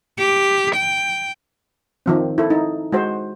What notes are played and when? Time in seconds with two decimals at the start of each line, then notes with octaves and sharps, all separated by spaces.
0.18 G4
0.76 G5
2.06 D#3 F3 C4
2.38 E4 A4
2.50 D#4
2.92 G#3 F#4 C5